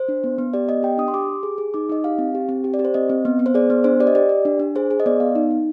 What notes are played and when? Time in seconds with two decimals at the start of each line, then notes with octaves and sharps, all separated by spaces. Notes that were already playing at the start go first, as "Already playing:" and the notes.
Already playing: C5
0.08 D4
0.24 B3
0.38 B3
0.53 G4 D5
0.69 B3 D#5
0.83 G4 G5
0.98 D4 D#6
1.08 C6
1.14 G4 D6
1.29 G4
1.43 G#4
1.58 G#4
1.74 D#4 D6
1.89 D#4 D#5
2.04 G4 F5
2.18 C4
2.35 G4
2.49 C4
2.64 G4
2.74 D5
2.79 G4
2.85 C5
2.94 C4 D#5
3.10 C4
3.25 B3
3.39 B3
3.46 C5
3.54 G#4 D5
3.70 B3
3.84 D4 C5
4.00 G4 D5
4.07 D#5
4.15 G4 D5
4.29 G4
4.45 D4
4.60 D4
4.75 G#4 C5
4.91 G#4
5.00 D#5
5.06 B3 D5
5.20 B3 F5
5.35 D#4
5.51 D#4